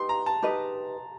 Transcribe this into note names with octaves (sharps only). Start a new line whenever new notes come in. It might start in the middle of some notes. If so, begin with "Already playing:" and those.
Already playing: D#4 G4 B4 D#5 C6
A#5
A5
D#4 G4 B4 D#5